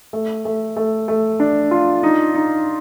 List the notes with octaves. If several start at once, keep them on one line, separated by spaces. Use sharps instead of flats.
A3
A3
A3
A3
D4
F4
D#4
D#4